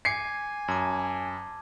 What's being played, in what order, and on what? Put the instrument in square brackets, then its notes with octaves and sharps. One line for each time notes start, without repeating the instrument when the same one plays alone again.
[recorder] G#5 [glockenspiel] D6 G#6 D#7 [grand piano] C7 C#7
[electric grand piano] F#2 [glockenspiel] A5 D6